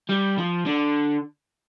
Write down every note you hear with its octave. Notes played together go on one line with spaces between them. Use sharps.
G3
F3
D3